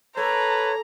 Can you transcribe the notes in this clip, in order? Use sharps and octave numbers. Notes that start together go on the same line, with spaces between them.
A#3 A4 B4 C#5 A#5